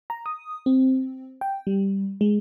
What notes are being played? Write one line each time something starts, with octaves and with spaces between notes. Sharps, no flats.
A#5
D#6
C4
G5
G3
G#3